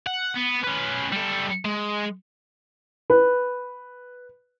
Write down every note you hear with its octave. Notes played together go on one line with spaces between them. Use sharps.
F#5
B3
C#4 B4
G3 A4
G#3
B4